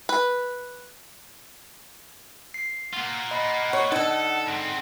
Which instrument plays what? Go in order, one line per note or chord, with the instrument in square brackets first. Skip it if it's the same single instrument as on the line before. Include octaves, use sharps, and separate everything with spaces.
[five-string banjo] B4
[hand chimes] C7
[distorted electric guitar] A#3 F4 [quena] F#5
[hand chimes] D#5 B5
[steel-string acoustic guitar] C#5
[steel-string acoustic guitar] D3 D#5 [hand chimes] D#4 [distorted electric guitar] A4
[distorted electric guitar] G#2 C4